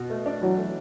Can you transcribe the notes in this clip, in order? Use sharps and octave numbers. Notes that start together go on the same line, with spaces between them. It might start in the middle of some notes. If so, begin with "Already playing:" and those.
Already playing: B2 F#4
A3
D4
E3 F#3
A3